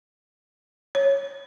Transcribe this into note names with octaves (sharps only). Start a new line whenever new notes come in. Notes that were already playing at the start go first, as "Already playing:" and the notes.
C#5